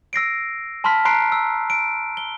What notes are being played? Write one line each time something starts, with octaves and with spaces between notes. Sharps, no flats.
E6 A#6 C7 D7
A5 B5 C6 F6 B6
A#5 C6 F#6 C7 D7
E6
D7
G7